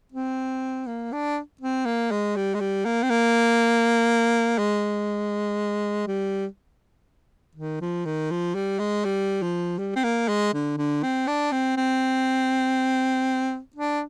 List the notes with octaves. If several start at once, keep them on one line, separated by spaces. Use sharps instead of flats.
C4
A#3
D4
C4
A#3
G#3
G3
G#3
G3
A#3
C4
A#3
G#3
G3
D#3
F3
D#3
F3
G3
G#3
G3
F3
G3
C4
A#3
G#3
D3
D3
C4
D4
C4
C4
D4